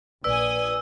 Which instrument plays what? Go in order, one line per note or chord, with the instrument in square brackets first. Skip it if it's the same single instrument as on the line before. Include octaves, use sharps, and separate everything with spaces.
[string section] A#1 G#5 D#6 [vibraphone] B4 D5 [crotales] E6